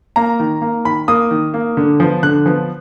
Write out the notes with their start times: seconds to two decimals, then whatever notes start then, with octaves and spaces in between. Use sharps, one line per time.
0.16 A#3 A#5
0.40 D#3
0.62 A#3
0.85 D#3 B5
1.08 A#3 D#6
1.31 D#3
1.54 A#3
1.77 D3
2.00 F3 B3
2.23 D3 F#6
2.46 F3 B3